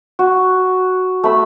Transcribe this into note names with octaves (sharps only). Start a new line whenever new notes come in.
F#4
A3 B5 E6